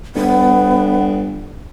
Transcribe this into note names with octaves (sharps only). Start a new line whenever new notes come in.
G1 B3